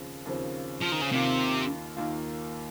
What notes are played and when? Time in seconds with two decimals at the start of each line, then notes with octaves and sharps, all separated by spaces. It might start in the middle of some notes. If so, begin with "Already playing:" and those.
Already playing: D#2 C#3 F3 C4
0.25 D#2 C#3 F3 C4
0.81 F3
0.92 D#3
1.02 C#3
1.11 D#2 C3 D#3 A#3 F4
1.96 D#2 D#3 A#3 F4